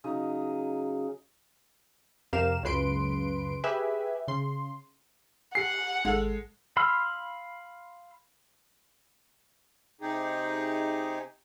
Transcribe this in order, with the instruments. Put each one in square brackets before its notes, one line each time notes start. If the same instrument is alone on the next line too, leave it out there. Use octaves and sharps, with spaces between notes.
[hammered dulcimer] C#3 F#3 D#4 D#5
[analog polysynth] F2 C3 G4 A#4 F5 E7
C#2 F#2 C#3 B4 C6 D7
G4 G#4 B4 E5 G#5
C#3 C6
[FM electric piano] G4 G#5 [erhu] F#5 [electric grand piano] C7
[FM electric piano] G#1 [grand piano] G#3 A4
[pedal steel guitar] F5 B5 C6 E6 F6
[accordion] C3 D#4 G4 G#4